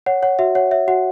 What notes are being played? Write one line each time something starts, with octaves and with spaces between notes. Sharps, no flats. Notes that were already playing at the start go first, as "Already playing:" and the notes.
C#5 F#5
C#5 F#5
F#4 E5
C#5 F#5
C#5 E5
F#4 F#5